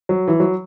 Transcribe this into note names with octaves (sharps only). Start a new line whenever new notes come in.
F#3
E3
F#3